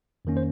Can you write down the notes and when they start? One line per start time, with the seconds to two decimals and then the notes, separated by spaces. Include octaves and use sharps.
0.25 F2 D#3 A#3 C#4
0.37 C5